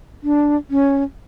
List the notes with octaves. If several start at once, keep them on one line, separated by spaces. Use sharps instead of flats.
D4
C#4